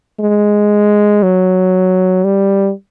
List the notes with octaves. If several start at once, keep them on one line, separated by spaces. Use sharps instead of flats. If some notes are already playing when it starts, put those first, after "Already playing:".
G#3
F#3
G3